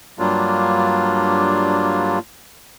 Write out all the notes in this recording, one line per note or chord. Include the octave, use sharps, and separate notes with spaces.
G2 F#3 G3 A#3 D4 F4